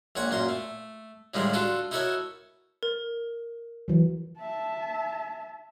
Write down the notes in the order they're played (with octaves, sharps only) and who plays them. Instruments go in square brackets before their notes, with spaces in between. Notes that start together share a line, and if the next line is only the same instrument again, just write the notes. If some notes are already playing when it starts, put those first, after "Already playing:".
[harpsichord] A#1 A#2 C#5 F#5 C#6
F#2 A#2 A#5 C6
A3
A2 D3 D#3 F3 G3 G#3
D4 F4 F#4 A4
D#4 E4 F#4 A4 A#4 C#5
[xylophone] A#4
[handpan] E3 F#3
[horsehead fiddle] E5 A5